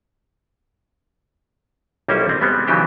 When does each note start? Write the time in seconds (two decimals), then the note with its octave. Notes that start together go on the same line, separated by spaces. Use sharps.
2.08 B1 G3 A#3 C#4 E4 C5
2.29 C4
2.41 G3 G#3 B3 C4
2.67 C#3 E3 F#3 D#4 G4 C5